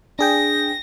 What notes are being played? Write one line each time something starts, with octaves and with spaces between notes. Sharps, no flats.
D4 G#4 G5 A#6